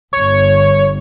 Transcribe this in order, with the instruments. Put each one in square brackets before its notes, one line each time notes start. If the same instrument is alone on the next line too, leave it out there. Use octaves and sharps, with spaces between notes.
[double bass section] G1 [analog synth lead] C#5